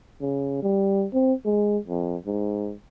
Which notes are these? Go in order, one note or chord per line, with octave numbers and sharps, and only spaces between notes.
C#3
G3
C4
G#3
F2
G#2